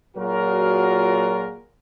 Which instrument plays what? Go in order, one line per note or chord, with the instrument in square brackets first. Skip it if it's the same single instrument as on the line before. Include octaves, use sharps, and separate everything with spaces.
[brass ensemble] A#2 F#3 F4 F#4 G#4 A#4